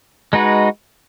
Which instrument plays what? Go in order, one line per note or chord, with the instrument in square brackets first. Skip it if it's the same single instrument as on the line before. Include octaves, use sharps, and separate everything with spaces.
[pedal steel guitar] G#3 D#4 F#4 B4